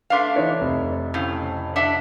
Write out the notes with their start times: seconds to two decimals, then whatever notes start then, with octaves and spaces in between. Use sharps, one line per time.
0.10 A3 D4 B4 F5 C6
0.36 E3 D#4 C#5
0.60 F1 F2
1.14 A2 C#3
1.76 D4 E5 F#5